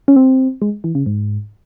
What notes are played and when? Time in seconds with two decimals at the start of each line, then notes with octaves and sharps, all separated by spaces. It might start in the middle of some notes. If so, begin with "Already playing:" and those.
0.08 C#4
0.16 C4
0.62 G#3
0.84 E3
0.95 C#3
1.06 G#2